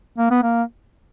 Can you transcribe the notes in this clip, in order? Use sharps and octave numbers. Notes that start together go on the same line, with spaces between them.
A#3
B3
A#3